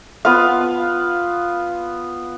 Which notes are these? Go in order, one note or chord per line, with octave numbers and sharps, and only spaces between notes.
B3 F4 B4 F5